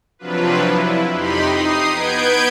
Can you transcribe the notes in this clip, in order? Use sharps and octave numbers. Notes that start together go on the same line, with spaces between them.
C3 F3 F#3 D4 F4 B4
E4
F2 D#4 G4 B5 C6
D#4 D#6 C7
B3 B4 G6 G#6 D7